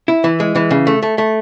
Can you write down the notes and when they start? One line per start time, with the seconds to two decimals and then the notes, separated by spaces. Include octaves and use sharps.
0.08 E4
0.24 E3
0.40 G#3
0.55 E3
0.71 C#3
0.87 A3
1.02 A3
1.18 A3